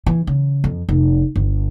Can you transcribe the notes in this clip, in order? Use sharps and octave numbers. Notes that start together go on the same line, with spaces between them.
E3
C#3
F2
F1
G1